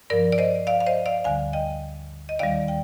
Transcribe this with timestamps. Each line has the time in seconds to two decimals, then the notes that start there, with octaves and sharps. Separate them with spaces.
0.10 G2 F3 A#4 D5
0.32 D5
0.38 C5 D#5
0.67 D5 F5
0.80 F5
0.86 C5 D#5
1.06 D5 F5
1.24 D2 D3 G3 F5 G#5
1.53 D#5 G5
2.29 D#5
2.39 D#2 D#3 G3 D5 F5
2.68 G5